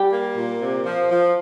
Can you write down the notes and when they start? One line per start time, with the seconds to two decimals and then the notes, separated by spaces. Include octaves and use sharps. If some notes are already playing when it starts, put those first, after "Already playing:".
Already playing: G3 G4
0.12 A#3
0.38 A#2
0.61 C3
0.86 F3
1.11 F3